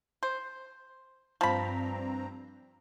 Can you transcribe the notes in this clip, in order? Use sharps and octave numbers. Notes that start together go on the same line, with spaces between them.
C5
G2 F3 C4 A#5 B5